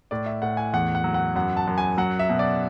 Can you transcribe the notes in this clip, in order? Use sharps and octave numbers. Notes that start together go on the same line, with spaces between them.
A2 D5
E5
A2 F#5
G#5
E2 F#5
F#5
F#3
F#5
F#2 F#5
A5
F#2
G#5
F#3 F#5
E5
B2
D5